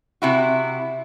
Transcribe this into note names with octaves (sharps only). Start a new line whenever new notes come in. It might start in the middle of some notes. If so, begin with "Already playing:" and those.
C3 E4 F#4